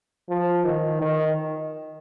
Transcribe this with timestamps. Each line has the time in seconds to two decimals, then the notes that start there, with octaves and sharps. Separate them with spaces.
0.29 F3
0.65 D#3
1.01 D#3